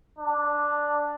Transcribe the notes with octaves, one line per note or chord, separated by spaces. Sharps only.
D4